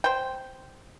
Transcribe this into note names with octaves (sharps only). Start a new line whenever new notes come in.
C5 G5